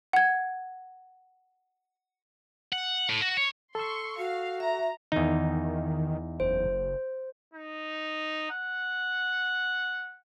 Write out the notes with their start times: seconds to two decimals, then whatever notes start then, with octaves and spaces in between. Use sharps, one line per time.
0.13 F#5 G#6
2.73 F#5
3.10 A2
3.22 F#4
3.37 C#5
3.75 A4 C6 C#6 E6
4.18 F#4 F5
4.60 E5 A#5
5.12 E2 D#3 D#4
6.40 F#1 C5
7.54 D#4
8.51 F#5